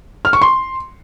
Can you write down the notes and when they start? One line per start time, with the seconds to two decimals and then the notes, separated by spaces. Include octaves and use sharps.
0.25 F6
0.33 C#6
0.41 C6